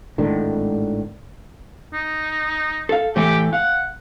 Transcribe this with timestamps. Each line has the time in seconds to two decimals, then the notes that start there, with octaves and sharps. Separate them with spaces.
0.18 G#1 A2 D3 D#3
1.93 D#4
2.89 A4 F5
3.16 A2 E3 A3 G4
3.53 F5 F#5